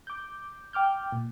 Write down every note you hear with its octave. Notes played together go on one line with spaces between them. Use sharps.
D6 G6
G5 D6 F6 G6
A#2